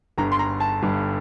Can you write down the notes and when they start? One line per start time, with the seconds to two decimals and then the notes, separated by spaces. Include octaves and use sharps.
0.18 G1 G2 D3 G3 A#5
0.32 C6
0.39 A#5
0.60 A5
0.82 G1 G2 D3 G3